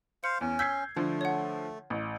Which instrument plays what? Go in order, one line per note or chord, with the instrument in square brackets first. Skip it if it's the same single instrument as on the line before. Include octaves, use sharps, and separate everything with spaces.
[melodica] C5 F5 [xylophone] C#7
[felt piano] E2 [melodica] C#4
[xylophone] E6 B6 [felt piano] G6 G#6 C7
[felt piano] D3 F3 [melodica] A3
[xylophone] C#5 F#5
[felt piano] A1